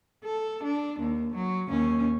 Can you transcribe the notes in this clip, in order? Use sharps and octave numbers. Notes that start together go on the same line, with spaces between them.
A4
D4
D#2
F#3
D#2 C#4